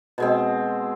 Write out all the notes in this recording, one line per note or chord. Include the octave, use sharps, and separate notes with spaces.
B2 G#3 C4